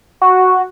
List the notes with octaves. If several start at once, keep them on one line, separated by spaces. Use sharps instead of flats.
F#4